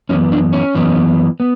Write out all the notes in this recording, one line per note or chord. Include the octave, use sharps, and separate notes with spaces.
F#2 E3 B3 C#4
D4
C#4
F#2 E3 B3
B3